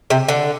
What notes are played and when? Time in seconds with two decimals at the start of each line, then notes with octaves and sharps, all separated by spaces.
0.10 C3
0.28 D3